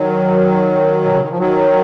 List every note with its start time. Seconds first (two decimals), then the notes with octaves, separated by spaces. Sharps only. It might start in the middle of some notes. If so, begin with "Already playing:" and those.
Already playing: D#3 F#3
1.05 B2
1.13 C#3
1.21 D#3
1.30 F3
1.38 D#3 F#3